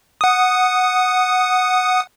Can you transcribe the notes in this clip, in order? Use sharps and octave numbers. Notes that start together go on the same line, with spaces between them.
F#5 D#6